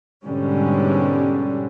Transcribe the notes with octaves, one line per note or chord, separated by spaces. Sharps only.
G#2 B2 D3 G3 C#4